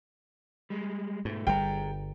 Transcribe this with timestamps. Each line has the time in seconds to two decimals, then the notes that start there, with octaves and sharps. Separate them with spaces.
0.70 G3 G#3
1.25 G#2 B2 A3
1.47 G1 G3 G#4 G5 A#5